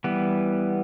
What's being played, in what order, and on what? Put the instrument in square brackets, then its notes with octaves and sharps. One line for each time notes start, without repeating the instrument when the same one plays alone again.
[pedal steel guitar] E3 G3 B3